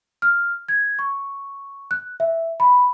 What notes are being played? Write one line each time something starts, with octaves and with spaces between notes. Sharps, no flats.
F6
G#6
C#6
F#6
E5
B5